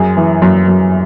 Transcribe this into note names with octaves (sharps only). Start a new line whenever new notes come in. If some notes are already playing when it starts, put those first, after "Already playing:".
Already playing: F#2 G#4
E3
F#2
F#2